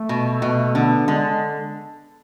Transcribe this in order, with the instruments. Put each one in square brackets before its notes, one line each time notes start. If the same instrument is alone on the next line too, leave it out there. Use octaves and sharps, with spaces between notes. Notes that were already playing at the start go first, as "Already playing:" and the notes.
Already playing: [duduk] A3
[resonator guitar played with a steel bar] B2
B2
[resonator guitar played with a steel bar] D3 [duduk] B3
[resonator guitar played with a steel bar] D3 [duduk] G#3